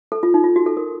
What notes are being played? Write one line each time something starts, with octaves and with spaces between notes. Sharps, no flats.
A4
F4
D#4
F4
F#4
A4
A#4